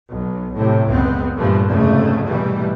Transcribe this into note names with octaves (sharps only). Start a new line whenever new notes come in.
B1
A2 C3
F#1 C#2 B3 C4
G2 A#2 E3 F3 G3 A3
F1 F2 G#2 C#3 A3
G#2 B2 E3 G3 A3